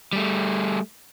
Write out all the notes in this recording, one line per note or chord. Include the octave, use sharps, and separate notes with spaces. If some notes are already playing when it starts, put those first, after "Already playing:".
G3 A3